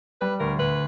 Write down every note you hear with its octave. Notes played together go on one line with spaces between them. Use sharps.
G3 B4
D2 A#4
D2 B4